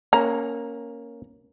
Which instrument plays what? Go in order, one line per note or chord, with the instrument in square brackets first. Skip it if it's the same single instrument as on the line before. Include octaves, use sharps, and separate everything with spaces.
[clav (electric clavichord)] A#3 C#4 [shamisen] A#5